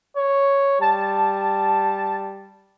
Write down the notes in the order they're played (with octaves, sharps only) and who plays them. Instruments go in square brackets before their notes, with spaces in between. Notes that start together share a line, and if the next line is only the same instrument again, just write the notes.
[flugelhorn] C#5
[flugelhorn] G3 [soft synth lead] A5